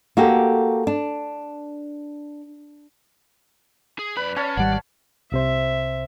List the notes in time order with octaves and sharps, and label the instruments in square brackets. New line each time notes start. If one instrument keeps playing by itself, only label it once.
[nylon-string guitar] A#3 F#4 G4 A4
D4
[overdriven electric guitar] G#4
[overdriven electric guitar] F#2 B5 [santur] B4 [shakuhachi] D5
[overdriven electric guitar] C#4 [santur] C#5 F5 A5
[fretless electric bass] G#1 G3 [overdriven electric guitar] D5 [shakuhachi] F#5
[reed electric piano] C2 C3 C5 [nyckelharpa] E5